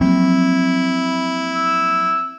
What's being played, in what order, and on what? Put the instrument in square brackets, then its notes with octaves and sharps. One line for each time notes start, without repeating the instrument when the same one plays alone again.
[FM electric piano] F3 F#3 A#3 [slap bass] C4 [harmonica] E4
[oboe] E6